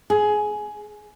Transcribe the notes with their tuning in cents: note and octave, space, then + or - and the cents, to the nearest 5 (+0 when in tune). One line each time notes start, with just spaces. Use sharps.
G#4 +15